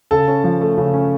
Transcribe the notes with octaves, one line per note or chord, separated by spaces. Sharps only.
C#3 A4 A5
C#4
F3
A3
C#3
C#4